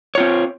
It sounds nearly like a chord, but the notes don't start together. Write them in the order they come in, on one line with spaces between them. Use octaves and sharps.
C#5 F4 C4